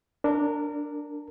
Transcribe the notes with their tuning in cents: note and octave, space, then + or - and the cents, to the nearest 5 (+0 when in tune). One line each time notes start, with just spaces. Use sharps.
D4 +0 A#4 -25